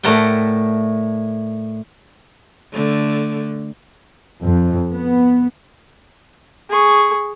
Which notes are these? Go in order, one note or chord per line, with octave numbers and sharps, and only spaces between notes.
A2 A3 A#4 D5 F#5 G5
D3 A3
F2
B3
G#4 C#6